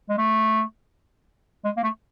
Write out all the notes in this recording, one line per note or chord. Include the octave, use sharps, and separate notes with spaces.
G#3
A3
G#3
A#3
A3